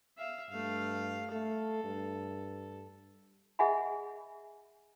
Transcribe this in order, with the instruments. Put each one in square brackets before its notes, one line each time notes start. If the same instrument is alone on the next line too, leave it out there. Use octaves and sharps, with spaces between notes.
[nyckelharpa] E5 F5
[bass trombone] G2 [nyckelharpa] A3 F5
[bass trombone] A3 [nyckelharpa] A4
[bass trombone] G2
[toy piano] G#4 D#5 E5 F#5 G#5 B5